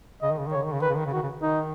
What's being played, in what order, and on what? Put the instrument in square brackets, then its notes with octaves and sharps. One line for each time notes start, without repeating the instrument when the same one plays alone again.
[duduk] C#3 [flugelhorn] D#5
[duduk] D#3
C#3
D#3
[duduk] C#3 [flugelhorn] C#5
[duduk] D#3
C#3
[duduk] D#3 [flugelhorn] B4
[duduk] C#3
D#3
C#3
[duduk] D#3 [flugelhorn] F#4
[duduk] C#3
[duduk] D#3 [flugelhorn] D#4